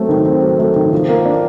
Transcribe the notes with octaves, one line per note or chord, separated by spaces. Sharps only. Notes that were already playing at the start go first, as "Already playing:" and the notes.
Already playing: F#3 A3 C4
D#3
C4
F#3
A3
D#3
F3
A#3
D4